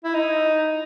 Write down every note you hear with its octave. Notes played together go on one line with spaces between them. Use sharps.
E4
D#4